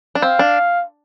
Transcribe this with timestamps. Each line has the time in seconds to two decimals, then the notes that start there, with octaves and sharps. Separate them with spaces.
0.15 D4
0.22 C4 F5
0.39 D4